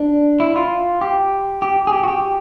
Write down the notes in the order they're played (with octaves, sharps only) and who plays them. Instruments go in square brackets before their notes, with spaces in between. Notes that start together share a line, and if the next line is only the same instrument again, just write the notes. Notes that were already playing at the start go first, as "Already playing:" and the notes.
Already playing: [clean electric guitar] D4
E4
F4
G4
G4
G#4
G4
F#4
G4